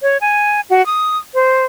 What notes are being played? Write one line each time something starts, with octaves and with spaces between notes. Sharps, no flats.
C#5
G#5
F#4
D#6
C5